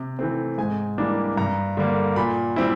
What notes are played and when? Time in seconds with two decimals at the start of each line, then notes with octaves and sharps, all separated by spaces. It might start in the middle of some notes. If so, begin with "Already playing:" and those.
Already playing: C3
0.19 E3 A3 C4
0.58 G#2 G#5
0.98 E3 G3 A#3 D4
1.37 G2 A#5
1.77 D3 G3 A#3
2.16 A#2 B5
2.56 G3 C4 E4